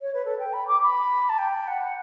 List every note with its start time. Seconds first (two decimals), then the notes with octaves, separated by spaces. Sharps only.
0.02 C#5
0.14 B4
0.25 A4
0.39 G5
0.53 B5
0.67 D6
0.82 B5
1.29 A5
1.38 G5
1.67 F#5